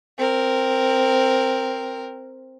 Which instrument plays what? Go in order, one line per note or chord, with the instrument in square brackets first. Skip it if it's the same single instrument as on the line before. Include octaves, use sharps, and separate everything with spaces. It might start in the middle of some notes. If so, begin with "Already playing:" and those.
[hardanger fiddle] C4 A#4